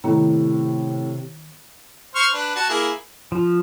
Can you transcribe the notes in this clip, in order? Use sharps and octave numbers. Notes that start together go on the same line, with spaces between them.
A2 C3 D#3 B3 A#5
C5 C#6 F6
D4 B4
F#4 A5
A#3 E4 G#4
F3